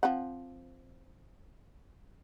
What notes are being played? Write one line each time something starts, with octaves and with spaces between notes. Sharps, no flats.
F3 C4 F#5